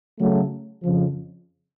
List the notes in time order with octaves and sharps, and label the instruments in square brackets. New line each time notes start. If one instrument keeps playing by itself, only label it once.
[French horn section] C#3 F#3 A3
F2 C#3 F3